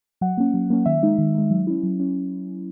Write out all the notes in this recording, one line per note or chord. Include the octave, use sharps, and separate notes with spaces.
F#3 F#5
A#3 C#4
F#3
A#3 C#4
D#3 E5
G#3 D#4
D#3
G#3 D#4
F#3
C#4 E4
F#3
C#4 E4